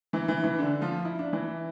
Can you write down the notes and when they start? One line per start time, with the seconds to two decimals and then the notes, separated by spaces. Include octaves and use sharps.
0.13 E3 E4
0.28 E3 E4
0.43 E3 E4
0.59 D3 D4
0.81 F3 F4
1.05 E4
1.19 D4
1.33 E3 E4